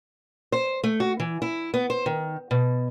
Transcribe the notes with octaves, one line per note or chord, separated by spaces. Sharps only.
C5
A3
F#4
E3
E4
B3
C5
D#3
B2